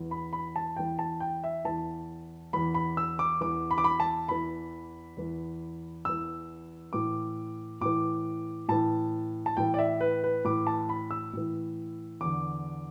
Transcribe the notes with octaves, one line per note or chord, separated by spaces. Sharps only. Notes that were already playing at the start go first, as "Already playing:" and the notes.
Already playing: E2 E3
B5
B5
A5
E2 E3 G5
A5
G5
E5
E2 E3 A5
E2 E3 B5
B5
E6
D6
E2 E3 D6
B5
D6
B5
A5
E2 E3 B5
E2 E3
E2 E3 E6
A2 E3 D6
A2 E3 D6
A2 E3 A5
A5
A2 E3 G5
D5
E5
B4
B4
A2 E3 D6
A5
B5
E6
A2 E3
E2 D3 D6